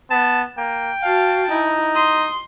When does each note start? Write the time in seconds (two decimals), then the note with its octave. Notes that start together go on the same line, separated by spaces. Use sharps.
0.10 B3 A5
0.57 A#3 G5
1.02 F#4 F5 A5
1.50 D#4 E4
1.95 C6 D#6